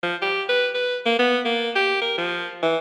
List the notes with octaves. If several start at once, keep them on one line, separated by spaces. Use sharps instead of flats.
F3
G4
B4
B4
A#3
B3
A#3
G4
A#4
F3
E3